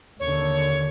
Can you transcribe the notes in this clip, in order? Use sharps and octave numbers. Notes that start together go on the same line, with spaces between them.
D#2 D3 C#5